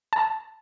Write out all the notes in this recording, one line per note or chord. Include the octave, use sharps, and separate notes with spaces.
A5